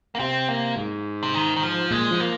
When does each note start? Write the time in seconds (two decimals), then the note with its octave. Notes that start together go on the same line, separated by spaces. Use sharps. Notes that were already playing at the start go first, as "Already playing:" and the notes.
0.15 A#3
0.19 C3 C4
0.48 A#3
0.76 G#2
1.23 C3
1.34 D#3
1.56 D#3
1.63 F3
1.91 A#2 G#3
2.11 F3
2.20 A#3